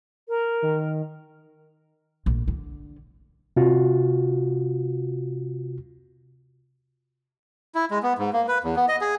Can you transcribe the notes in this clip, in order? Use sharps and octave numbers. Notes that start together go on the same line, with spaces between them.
A#4
D#3
A#1
D3
C3 F4 F#4
E4
G#3
B3
G#2
A#3
B4
E2
B3
D#5
G#4